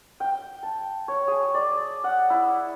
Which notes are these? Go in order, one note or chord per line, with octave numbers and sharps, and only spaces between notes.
G5
A5
C#5
G#4
D5
F#5
E4